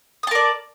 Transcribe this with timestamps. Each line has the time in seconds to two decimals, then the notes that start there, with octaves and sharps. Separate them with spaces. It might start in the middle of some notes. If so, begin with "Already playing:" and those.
0.23 D#6
0.27 A5
0.31 A#4
0.35 D5